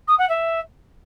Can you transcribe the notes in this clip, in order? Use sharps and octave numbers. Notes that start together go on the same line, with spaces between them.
D#6
F#5
E5